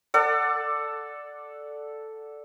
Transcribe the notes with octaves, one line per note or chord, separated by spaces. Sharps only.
A4 D5 F#5